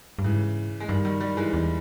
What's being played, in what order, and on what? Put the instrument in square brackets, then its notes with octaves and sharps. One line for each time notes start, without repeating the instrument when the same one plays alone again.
[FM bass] G2
[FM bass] G#2 [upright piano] C#3 E3
[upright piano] G#3
[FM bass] G2 [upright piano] D#3 G3
[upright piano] D#3 G3
D#3 G3
E3 G#3
[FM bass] E2